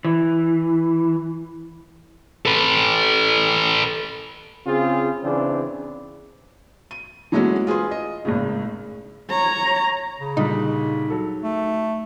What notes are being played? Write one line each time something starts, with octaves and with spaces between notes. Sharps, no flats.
E3
A4 B4
C#3 C4 F4 G#4
C#3 E3 C4 D4
D#7
E3 F#3 G#3 A3 C#4 F#4
F4 G#4 B4 C6
D#5
G#1 A2 C#3
C#5 A#5
C#3
A#2 D3 G3 D#4
F#3 A4
A3